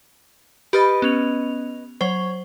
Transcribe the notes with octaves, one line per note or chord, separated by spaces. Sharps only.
G4 B4 D#5 F6 A6
B3 C#4 F7
F#3 C5 C#5